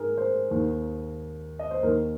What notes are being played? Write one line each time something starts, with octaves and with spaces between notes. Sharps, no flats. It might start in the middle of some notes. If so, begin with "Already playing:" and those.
Already playing: G#2 G#4 A#4
C5
D#2 D#3
D#5
C5
D#2 A#4
D#3